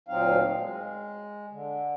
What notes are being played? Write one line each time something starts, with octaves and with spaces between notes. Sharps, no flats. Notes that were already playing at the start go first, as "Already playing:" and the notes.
D2 A#2 F#3 C4 D#4 F5
G#3
D3